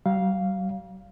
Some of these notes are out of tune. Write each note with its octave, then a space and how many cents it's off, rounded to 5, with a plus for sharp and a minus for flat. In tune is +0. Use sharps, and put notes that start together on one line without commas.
G3 -45 F5 +0